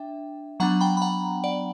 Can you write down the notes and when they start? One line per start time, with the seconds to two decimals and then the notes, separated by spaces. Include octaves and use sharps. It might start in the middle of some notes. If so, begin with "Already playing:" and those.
Already playing: D4 E5 G5
0.60 F#3 B3 D4 F#5 A#5
0.81 G5 B5
0.97 B5
1.02 F#5 A#5
1.44 D5 F#5